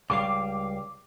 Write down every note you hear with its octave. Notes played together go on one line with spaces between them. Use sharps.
C#2 G3 F5 D6